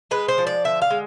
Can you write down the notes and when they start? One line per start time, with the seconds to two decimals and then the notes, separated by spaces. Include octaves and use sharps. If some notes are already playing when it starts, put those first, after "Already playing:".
0.11 G#3 B4
0.28 C5
0.38 F3
0.47 D5
0.64 D3 E5
0.82 F5
0.90 G#3